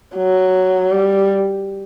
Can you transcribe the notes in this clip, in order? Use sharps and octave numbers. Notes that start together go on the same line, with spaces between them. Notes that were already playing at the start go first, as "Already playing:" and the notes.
F#3
G3